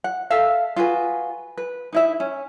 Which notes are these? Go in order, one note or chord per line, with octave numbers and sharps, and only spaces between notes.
F#5
A4 E5 F5
F4 F#4 G#4 B4
B4
D#4 E4 E5
C#4